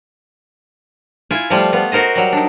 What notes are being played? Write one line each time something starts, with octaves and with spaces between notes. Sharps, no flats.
E4 F4 G#5
F3 G3 A3 F4
B3 F4
F#4 A#4 C5 D#5
F#3 G3
D4 D#4